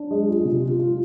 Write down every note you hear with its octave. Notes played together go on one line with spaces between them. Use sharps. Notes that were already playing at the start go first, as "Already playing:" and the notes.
Already playing: D4
G#3
F4
C3
F4
F4